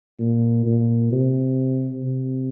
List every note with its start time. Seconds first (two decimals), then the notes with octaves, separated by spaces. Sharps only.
0.20 A#2
0.66 A#2
1.12 C3
2.04 C3